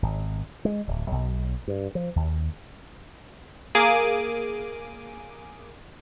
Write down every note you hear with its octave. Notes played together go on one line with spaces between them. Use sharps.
G#1
G#3
D1
B1
G2
F3
D#2
A#3 G#4 D6 D#7